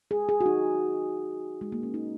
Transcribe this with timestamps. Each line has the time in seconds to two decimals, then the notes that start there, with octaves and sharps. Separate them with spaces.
0.11 G#4
0.29 G#4
0.41 F#4
0.46 D#4
1.61 G#3
1.72 A#3
1.83 C#4
1.94 D#4